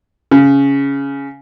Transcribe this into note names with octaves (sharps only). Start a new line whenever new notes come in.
C#3